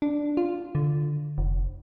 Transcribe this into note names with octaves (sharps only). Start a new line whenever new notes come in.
D4
F4
D3
F1